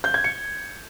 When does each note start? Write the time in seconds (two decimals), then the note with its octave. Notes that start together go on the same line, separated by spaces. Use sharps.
0.04 G6
0.14 G#6
0.24 C#7